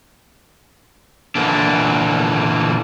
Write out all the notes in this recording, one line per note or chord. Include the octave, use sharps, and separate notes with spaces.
A#2 D3 E3 A#3 D4